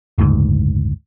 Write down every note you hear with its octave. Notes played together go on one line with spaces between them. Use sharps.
F#1 D2 G#2